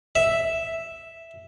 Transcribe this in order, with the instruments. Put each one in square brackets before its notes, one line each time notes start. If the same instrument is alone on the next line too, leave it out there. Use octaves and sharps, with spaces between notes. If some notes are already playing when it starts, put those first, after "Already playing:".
[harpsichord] E5